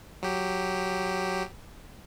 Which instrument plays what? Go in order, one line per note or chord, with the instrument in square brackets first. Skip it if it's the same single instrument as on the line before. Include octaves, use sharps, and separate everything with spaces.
[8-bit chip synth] F#3 G4